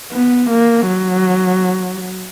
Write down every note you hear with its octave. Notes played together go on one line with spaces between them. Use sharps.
B3
A#3
F#3